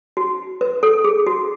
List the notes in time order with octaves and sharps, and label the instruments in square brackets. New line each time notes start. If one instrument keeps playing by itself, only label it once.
[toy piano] F#4
B4
A4
G#4
F#4